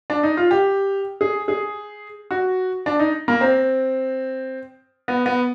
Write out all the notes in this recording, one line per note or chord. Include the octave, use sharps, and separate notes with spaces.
D4
D#4
F4
G4
G#4
G#4
F#4
D4
D#4
A#3
C4
B3
B3